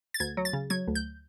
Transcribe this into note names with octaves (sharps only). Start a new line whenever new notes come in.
A6
D2 G#6
F#3
A6
C#3
F#3 G#6
D2
G6